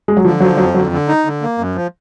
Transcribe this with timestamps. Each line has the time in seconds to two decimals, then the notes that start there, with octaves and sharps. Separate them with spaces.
0.08 G#3
0.17 F#3
0.25 D3 F3
0.40 F3 F#3
0.57 F2 F#3
0.74 D3 F#3
0.92 D3
1.08 D#4
1.25 D3
1.42 A#3
1.58 F#2
1.75 F3